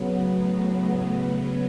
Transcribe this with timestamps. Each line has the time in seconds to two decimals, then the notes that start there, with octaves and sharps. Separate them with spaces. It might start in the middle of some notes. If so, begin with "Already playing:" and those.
Already playing: C#3 F#3 B3
0.13 A2